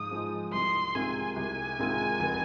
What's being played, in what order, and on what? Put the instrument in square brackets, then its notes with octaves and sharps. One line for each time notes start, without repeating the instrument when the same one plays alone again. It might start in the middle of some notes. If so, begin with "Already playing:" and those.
Already playing: [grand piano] G#2 F3 G#3 [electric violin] D#6
[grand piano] F3 G#3 D#4
[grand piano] C2 [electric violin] C6
[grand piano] C3 D#3 G#3 F4 [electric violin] G#5
[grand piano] C2 [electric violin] G#5
[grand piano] C3 D#3 G#3 F4
F1